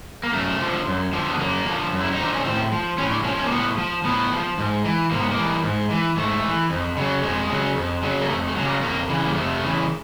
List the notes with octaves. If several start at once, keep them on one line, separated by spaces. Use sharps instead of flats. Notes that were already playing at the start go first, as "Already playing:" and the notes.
A#3
F#2 A3
D3 F3
F#2
D3 F3
B3
F#2 A#3
D3 F3
F#2
E4
D#4
D3 F3 D4
C#4
A2 C4
F3
A2 C#4
D4
F3 C#4
C#4
A#3
A2 B3
F3
A2 B3
F3
G#2
E3
G#2 A#3
B3
A#3
E3
G#2
E3
G#2 A3
E3
F2
C#3 F#3
F2 G#3
C#3 F#3
F2
C#3 F#3
A#3
F2 A3
A3
C#3 F#3
A#3
F2 A#3
C#3 E3
A#3
F2 A3
C#3 E3